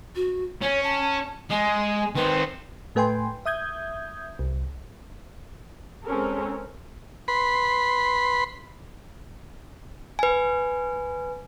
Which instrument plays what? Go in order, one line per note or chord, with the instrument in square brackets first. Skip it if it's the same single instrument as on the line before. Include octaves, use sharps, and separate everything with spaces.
[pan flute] F#4
[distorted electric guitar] C#4 [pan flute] C#5
[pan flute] A5
[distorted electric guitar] G#3 [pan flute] G#5
[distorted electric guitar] D#3 C4 [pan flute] B4
[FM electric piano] A2 A3 B4 G5 G#5 C6
E5 D#6 G6 G#6
C2
[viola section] G#3 C4 C#4 A4 A#4
[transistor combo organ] B4 B5 C6
[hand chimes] B4 G#5